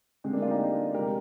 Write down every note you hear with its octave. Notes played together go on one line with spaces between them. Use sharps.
D3 G3 G#3 A#3 C4 D4
D4 F4
D#4 G4
C3 F3 G#3 G4 A#4